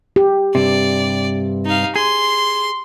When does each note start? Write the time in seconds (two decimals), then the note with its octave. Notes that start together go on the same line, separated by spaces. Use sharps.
0.16 G4
0.55 G2 C3 D5
1.65 D#4 F5
1.96 G#4 C6